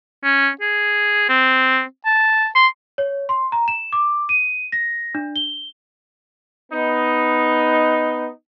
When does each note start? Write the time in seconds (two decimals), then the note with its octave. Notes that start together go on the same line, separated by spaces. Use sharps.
0.24 C#4
0.61 G#4
1.29 C4
2.05 A5
2.55 C6
2.98 C#5
3.29 C6
3.52 A#5
3.68 E7
3.93 D6
4.29 D#7
4.72 A#6
5.15 D4
5.36 G7
6.73 B3 D#4